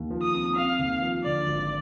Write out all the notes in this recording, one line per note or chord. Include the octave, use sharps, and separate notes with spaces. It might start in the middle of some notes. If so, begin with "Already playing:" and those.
Already playing: D#2
F3
D#6
C4
C4 F5
D#2
F3
D3 D5
G#1